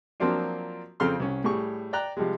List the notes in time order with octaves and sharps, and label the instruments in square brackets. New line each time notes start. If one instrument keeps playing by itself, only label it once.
[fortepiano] F3 F#3 A#3 C4 D4 F4
F2 C#3 C4 A4 C6 F6
C2 C#4
A2 G3 G#4 C#6
D5 G5 A#5 F#6
C3 F3 G3 G#3